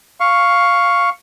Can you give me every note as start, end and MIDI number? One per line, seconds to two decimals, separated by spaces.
0.20 1.10 77
0.20 1.10 85